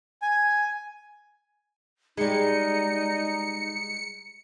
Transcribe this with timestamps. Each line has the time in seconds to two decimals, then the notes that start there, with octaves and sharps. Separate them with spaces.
0.22 G#5
2.17 G3 G#3 D#4 C#7